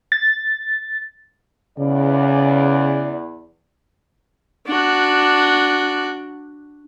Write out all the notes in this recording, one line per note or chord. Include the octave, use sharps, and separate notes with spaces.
A6
E2 C#3 D5
D4 F#4